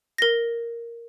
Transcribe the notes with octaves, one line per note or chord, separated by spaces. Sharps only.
A#4 A#6